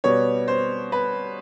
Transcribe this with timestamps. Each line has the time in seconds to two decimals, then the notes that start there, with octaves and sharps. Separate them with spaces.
0.04 B2 G3 B3 C#5
0.48 C5
0.92 B4